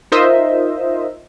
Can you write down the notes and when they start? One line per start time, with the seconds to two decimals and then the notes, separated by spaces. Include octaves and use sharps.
0.12 D#4 F4 A#4 C5 D#5 E5